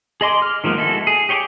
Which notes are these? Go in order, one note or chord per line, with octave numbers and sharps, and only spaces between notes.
G#4 D#5 C6 D6
F6
D#3 F3 G#3 A#3 B3
G#3 E4 F#4 A4
G#4
G4 C#5 G5 G#5 D6